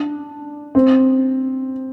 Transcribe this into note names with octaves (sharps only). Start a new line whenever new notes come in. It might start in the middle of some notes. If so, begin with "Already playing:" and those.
Already playing: D4
C4